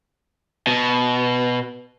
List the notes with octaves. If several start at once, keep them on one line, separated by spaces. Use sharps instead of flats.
B2